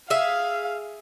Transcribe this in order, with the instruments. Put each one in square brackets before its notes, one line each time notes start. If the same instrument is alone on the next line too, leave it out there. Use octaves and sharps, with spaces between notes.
[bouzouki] G#4 E5 [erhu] F5